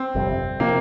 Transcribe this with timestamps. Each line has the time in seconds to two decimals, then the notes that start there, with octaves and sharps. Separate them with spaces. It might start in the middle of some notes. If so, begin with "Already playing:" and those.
Already playing: C4
0.15 G1 F2 C3 G3
0.60 C3 F3 A#3 C4